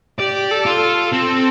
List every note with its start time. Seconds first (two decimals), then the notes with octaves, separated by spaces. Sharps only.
0.19 G4 D5
0.51 A4
0.66 F4
0.81 A4
1.13 C4